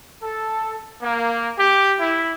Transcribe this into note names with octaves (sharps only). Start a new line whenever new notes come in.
A4
A#3
G4
E4